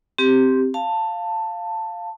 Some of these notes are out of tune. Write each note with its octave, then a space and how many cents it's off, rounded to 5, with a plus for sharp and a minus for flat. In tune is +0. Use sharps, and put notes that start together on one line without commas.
C4 +0 G4 +0
F5 +0 A5 +15